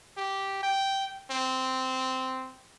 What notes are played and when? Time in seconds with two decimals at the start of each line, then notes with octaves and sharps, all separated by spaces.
0.17 G4
0.63 G5
1.31 C4